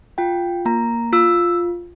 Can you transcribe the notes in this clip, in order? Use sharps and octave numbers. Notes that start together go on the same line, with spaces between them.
F4 G5
A#3 A#5
F4 E6